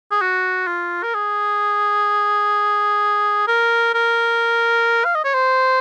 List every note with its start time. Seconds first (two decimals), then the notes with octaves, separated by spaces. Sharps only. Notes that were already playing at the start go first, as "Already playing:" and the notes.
0.11 G#4
0.21 F#4
0.67 F4
1.03 A#4
1.14 G#4
3.47 A#4
3.94 A#4
5.04 F5
5.15 D#5
5.24 C#5
5.34 C5